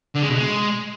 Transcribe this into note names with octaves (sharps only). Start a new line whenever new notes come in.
D3
G#3
B2
G#3